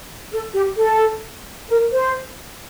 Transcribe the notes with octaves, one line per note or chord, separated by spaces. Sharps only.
A4
G4
A4
A#4
C5